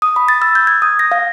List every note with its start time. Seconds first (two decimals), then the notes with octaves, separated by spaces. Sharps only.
0.02 D#6
0.16 B5
0.28 A6
0.42 E6
0.55 G6
0.67 G#6
0.82 D#6
0.99 A#6
1.12 F5